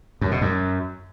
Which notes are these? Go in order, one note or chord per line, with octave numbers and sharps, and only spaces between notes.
F#2
B2
F#2